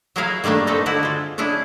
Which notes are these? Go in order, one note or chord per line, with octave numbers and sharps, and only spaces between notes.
F#3 E4 G#4 A#4 E5 F5
D#3 G3 A3 A#3 D4
A3 C4 D#4 A4
D3 E4 F#4
G#3 F4
C#4 D4 E4 G#4